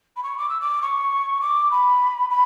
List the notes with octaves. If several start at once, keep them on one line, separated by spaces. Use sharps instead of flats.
B5
C#6
D6
E6
D6
C#6
D6
B5
B5